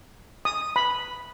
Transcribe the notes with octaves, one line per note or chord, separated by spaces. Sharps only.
D#6
B5